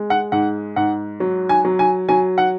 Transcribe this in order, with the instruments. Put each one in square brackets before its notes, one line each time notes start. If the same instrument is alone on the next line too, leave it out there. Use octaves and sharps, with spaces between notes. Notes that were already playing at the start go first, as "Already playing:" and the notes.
Already playing: [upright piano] G#3
F#5
G#2 F#5
G#2 F#5
F#3
G#5
F#3
G#5
F#3 G#5
F#5